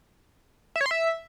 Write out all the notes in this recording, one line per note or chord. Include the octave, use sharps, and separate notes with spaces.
E5
C#5
C6
E5